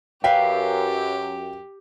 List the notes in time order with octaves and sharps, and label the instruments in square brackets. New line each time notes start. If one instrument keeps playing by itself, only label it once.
[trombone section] F#2 [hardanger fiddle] G4 [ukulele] B4 E5 F5 [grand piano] G5